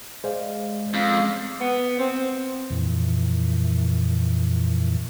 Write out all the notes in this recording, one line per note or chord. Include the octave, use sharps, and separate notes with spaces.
G#3 C5 D5 F5
F2 C#4 F5
B3
C4
F2 A#2 E3